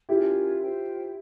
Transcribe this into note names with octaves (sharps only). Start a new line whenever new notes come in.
C#4 E4 F4 G4 A#4 C#5
F4 C5 G5